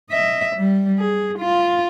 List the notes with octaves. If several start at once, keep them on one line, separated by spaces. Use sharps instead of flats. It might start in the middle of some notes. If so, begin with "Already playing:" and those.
D#5 E5
G3
G#4
F4